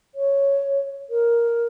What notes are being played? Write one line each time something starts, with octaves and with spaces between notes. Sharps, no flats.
C#5
A#4